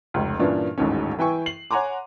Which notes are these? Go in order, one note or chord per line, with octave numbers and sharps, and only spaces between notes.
F1 C#2
G2 A#2 E3 C#4 D4
D#1 A1 D#2 G#2 C#4
E3 E4 G5 G#5 C#6
C7 F#7
C#5 F#5 G#5 A#5 C6 D6